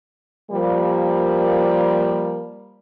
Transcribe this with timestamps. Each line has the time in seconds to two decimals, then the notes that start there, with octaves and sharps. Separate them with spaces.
0.51 F3 G3 A#3